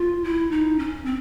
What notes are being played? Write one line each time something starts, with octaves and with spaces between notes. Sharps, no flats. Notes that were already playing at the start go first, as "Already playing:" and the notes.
Already playing: F4
E4
D#4
C#4
C4